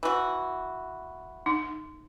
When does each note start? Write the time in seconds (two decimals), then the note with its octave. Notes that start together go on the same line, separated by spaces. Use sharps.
0.03 E3 F#4
1.46 D#4